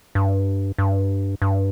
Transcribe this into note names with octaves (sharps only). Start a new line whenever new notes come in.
G2
G2
G2